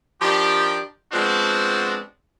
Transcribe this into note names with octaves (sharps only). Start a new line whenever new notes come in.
D#3 F3 D4 G4
F3 G#3 B3 C4 D4 F#4